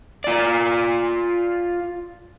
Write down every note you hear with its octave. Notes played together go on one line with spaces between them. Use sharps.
F4 D5